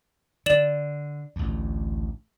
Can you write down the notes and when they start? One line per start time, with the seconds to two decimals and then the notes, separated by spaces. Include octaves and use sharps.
0.46 D3 D5 E7 F#7
1.36 A1 D2